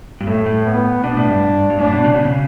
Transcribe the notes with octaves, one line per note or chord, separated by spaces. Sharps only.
G2
A2 A3
A2
B3
B2 D4
A2
G2
G2
A2 D4
B2
C#3
B2
C#3